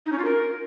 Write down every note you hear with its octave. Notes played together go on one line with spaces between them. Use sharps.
D#4
C#4
F4
A#4